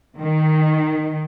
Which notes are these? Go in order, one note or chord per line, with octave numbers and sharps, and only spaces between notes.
D#3